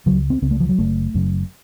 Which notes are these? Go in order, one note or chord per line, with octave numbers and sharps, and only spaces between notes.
C#2 C#3 F#3
C4
C#2 C#3 C4
A3
F3
F#3
F#1 F#2 C#3 A3
F#1 F#2 C#3